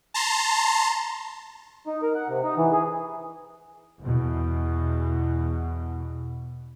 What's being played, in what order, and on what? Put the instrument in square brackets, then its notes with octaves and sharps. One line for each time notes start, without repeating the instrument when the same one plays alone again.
[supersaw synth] A5 A#5 C6
[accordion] D#4
A#4
F#5
C3
D#4
E3
G#4
[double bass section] E2 B2